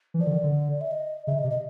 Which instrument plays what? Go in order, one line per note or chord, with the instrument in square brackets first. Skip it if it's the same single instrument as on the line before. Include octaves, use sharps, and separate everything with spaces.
[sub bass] E3
[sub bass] F3 [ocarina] D5
[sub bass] D3
D#3
D3
[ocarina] E5
D#5
[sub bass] C#3 [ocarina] E5
[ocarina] D#5
[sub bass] C3
[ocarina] D#5